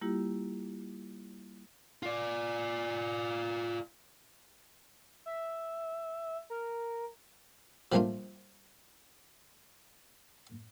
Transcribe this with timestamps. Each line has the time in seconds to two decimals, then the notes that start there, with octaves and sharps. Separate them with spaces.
0.01 G3 A#3 E4 F4 G4
2.03 F4 D5
5.26 E5
6.50 A#4
7.92 F3 G3 A3 A#3 D4 F4